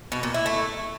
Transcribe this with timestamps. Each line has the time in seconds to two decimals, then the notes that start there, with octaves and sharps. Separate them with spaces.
0.12 B2
0.23 A#2
0.34 E4
0.46 A3